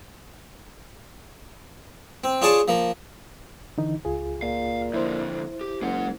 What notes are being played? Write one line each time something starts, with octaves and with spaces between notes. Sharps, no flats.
C4
D4 F4 G#4 C#5 D5 A5
F3 A#3
D3 E3 D#4
C#2 F4 G#4
A#2 F5
F2 D3 E4 C5
G4
F#1 G#3 F#5